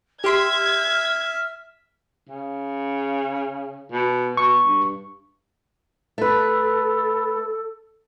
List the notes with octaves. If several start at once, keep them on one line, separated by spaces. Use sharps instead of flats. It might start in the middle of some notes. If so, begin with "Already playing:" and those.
G4 E5 C6 F6 G#6
C#3
B2
B2 C#6
G2
A3 A4 B4